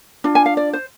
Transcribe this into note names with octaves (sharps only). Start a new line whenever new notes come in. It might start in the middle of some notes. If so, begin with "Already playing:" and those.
D4 F4
G#5
F5
D5
C5